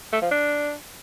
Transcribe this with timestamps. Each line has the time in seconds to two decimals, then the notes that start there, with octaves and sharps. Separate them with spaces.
0.12 A3
0.22 F3
0.31 D4